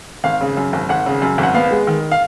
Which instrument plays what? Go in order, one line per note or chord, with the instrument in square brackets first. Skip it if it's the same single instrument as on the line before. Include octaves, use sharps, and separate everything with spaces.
[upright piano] G#1 F5
C#3
F#2
G#1
G#1 F#5
C#3
F#2
G#1
F#5
B3 F5
G#3
D#3
F5